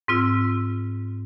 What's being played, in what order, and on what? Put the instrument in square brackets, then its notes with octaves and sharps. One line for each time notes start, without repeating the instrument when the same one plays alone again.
[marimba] G#2 C4 F4 E6